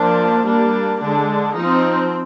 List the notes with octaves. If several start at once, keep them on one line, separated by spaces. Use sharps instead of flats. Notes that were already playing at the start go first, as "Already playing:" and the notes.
Already playing: F3 A#3 D4
G3 A#3 D4
D3 G#3 D4
F3 C4 D#4